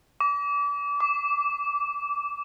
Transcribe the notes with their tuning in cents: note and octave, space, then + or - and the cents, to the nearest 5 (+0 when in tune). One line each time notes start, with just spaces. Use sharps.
D6 -35
D6 -10